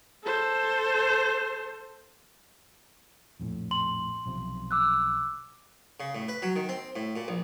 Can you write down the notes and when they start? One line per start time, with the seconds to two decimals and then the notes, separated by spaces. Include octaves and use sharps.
0.24 A4 C5
3.40 A#1 F2 A2
3.71 C6 F#7
4.26 B1 C3 F3
4.71 D6 E6 F#6
6.00 C#3
6.15 A2
6.28 B4
6.42 F#3
6.56 D#3
6.69 C4
6.96 A2
7.16 A#2
7.28 A#1